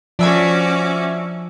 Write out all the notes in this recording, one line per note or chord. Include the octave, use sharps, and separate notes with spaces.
F3 C#4 D4 F#4 E5 G#5 D6